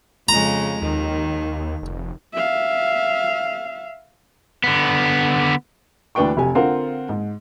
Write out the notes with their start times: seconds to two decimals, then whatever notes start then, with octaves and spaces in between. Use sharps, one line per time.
0.29 F2 C#3 G#3 A#5
0.82 D#2 D#3
1.82 F1
2.33 E5 F5
4.64 D3 B3
6.15 D2 E3 D4 B4 G5 C#6
6.37 F1 G4 G#5
6.55 D3 C4 F4 A#4 F#5
7.09 G#2